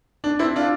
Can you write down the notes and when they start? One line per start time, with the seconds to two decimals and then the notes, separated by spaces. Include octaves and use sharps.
0.24 D4
0.39 C4 E4
0.56 D4 F4